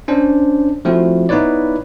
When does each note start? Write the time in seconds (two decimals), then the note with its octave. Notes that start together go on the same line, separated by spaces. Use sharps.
0.08 C#4 D4 C5
0.85 F3 A3 C4 E4 F#4
1.29 B3 D#4 E4 B4 C#5 D5